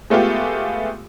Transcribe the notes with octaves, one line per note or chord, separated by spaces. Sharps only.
G#3 A3 B3 F4 G4